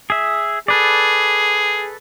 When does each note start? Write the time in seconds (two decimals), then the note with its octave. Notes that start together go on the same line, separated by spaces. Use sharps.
0.10 G#4 E5
0.68 G#4 A4 B4 D5